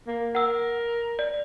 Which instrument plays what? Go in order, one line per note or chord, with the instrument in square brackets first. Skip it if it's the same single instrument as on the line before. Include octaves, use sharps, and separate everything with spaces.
[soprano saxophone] A#3
[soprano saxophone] A#4 [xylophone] F#5 E6
[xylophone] D5